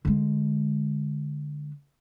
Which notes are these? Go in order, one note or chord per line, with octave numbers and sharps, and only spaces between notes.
D3 G#3